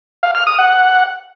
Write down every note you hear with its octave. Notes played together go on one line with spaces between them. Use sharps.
F5
F6
D#6
F#5